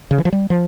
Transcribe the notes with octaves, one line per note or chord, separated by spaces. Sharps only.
C#3
E3
F3
G3
F3